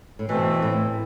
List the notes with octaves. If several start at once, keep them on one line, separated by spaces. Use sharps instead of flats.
A2
B2 E3 A3 C4
A2